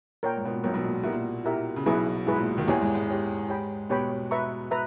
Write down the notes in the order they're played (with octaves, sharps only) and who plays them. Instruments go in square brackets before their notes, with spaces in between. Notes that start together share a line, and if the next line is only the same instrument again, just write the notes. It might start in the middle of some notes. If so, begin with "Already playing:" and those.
[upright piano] A#2 [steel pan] A#4 C#5 G5
[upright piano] G#2
B2
A#2
[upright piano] B1 B2 [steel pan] A#4 C#5 G5
[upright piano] B1 B2
A#2
A#2
[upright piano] B2 [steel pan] E4 G4 A#4 E5
[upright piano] A#2
[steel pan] E4 G4 A#4 E5
[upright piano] C#3
[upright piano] B1 B2 [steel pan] E4 G#4 B4
[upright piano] G#2 [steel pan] E4 G#4 B4
[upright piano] A#2
D#2 D#3
[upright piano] E2 E3 [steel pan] G4 C#5 G#5
[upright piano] G#2 G#3
G#2 G#3
[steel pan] G4 C#5 G#5
G4 C#5 G5 B5
[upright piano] B2 B3 [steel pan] G4 C#5 G5 B5
[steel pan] B4 E5 A#5 C#6
B4 E5 A#5